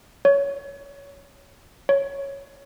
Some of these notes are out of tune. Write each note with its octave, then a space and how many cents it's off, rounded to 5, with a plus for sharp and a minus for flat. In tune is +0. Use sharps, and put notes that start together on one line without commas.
C#5 +15
C#5 +0